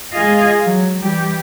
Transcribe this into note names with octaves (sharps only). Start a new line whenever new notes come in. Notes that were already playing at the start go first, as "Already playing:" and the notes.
G#3 F4 G#4 D#5 F5
F#3
E3 G3 G4